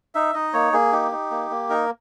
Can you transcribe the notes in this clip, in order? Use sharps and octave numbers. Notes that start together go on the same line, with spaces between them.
D#4 E5
D#4 D#5
A#3 C#5
A#3 G#4
D#4 G4
D#4
A#3
A#3
D#4 A#4